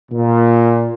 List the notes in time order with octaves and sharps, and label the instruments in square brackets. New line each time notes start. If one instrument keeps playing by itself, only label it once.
[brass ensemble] A#2